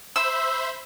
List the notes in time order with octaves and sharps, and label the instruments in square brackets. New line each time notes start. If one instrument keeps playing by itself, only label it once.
[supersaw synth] C5 E5 B5 [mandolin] E6